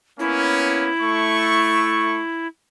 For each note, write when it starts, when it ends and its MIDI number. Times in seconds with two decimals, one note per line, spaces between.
0.19 0.91 58
0.19 0.91 59
0.19 0.91 61
0.19 2.47 64
1.02 2.22 57
1.02 2.22 85